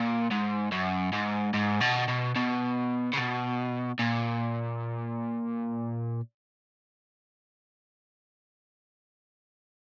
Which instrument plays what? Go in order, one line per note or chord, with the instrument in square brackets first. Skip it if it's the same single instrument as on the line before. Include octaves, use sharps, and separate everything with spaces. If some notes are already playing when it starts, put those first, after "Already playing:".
Already playing: [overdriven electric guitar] A#2
G#2
F#2
G#2
G#2
B2
B2
B2
C#3
B2
A#2